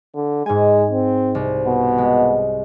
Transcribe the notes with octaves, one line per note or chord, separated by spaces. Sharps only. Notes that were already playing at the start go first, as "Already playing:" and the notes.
D3
G#2 G#3 G#5
C4
C2
B2
G#3